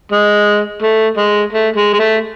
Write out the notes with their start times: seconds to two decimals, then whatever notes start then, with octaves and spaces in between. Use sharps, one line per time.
0.12 G#3
0.82 A3
1.17 G#3
1.52 A3
1.76 G#3
1.93 G#3
2.00 A3